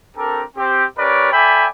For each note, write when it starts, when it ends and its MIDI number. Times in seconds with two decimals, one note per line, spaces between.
0.16 0.42 60
0.16 0.42 62
0.16 0.42 67
0.16 0.42 69
0.16 0.42 70
0.56 0.84 60
0.56 0.84 67
0.97 1.30 61
0.97 1.30 67
0.97 1.30 70
0.97 1.30 71
0.97 1.30 73
0.97 1.30 74
1.32 1.67 69
1.32 1.67 74
1.32 1.67 76
1.32 1.67 79
1.32 1.67 80
1.32 1.67 83